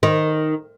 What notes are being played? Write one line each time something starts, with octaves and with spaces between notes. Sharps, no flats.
D#3